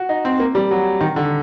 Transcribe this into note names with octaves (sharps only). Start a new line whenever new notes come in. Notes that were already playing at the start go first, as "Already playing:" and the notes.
Already playing: F#4
D#4
C4
A#3
G3
F#3
D#3
D3